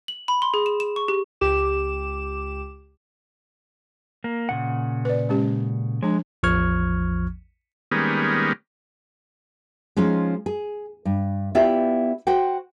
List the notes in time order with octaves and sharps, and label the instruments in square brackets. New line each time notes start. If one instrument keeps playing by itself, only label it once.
[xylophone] F#7
B5
C6
G#4
E7
E7
C#6
G4
[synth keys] C#2 G4 D6 E7
[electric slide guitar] A#3
A#2 C#3 F#5
[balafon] B4 D5
G#3 C#4 G4
[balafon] F3 D4 [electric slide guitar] G#3
[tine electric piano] A1 E2 F3 C#6 F6 G#6
[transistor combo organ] D#3 G3 G#3 A#3 B3 C#4
[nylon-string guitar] F3 G#3 C#4 D#4 F4
G#4
G2
B3 E4 F4 G4 D5 E5
F#4 C5 F#5 G5